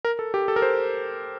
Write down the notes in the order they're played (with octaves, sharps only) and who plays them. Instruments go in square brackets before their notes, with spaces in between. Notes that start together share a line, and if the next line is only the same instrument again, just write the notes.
[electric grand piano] A#4
A4
G4
A4
A#4
C5